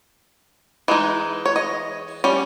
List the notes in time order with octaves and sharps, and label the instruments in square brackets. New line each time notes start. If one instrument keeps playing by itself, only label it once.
[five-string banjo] E3 G#3 D#4
C#5
D#5
G3 C#4